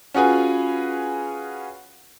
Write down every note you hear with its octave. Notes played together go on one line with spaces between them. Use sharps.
C#4 F4 F#4 G#4 B4 G#5